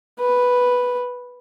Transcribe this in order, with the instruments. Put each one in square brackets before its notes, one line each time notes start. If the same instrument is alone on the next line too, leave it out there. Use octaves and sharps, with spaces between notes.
[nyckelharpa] B4